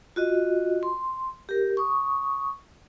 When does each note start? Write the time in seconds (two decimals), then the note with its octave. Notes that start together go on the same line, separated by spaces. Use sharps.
0.16 F4 F#4 D#5
0.83 C6
1.49 G4 A#4
1.77 C#6 D#6